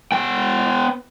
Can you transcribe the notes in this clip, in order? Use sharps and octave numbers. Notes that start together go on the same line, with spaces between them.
B3 G5